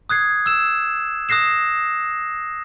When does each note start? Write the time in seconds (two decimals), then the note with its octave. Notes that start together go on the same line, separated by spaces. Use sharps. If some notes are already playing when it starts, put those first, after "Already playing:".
0.09 D#6 F#6 G#6 C7
0.46 E6 E7
1.29 D#6 F#6 A#6 C7 E7